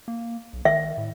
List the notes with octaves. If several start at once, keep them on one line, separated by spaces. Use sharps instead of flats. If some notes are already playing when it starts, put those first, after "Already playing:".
A#3
B1
D#3 E5
A2